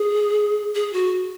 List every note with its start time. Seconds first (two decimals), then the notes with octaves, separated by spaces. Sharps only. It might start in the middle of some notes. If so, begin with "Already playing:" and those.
Already playing: G#4
0.75 G#4
0.93 F#4